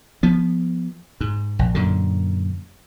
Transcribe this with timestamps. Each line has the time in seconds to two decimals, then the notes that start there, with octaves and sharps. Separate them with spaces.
0.23 F3 B3
1.21 G#2
1.59 A#1
1.75 F#2 A#2 D3